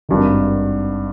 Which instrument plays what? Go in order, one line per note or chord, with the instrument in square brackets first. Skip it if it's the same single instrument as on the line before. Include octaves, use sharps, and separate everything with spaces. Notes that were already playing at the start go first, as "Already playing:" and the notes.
[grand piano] G#1 G2 D#3